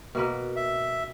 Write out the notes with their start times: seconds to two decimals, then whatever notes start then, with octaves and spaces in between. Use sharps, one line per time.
0.15 B2 A#3 B4
0.56 E5